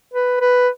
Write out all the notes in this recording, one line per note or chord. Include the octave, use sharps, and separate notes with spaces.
B4
B4